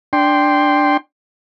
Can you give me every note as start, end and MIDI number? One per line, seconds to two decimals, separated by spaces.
0.13 0.97 62
0.13 0.97 79
0.13 0.97 84